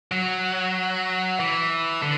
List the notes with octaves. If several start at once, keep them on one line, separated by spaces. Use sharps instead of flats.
F#3
E3
D3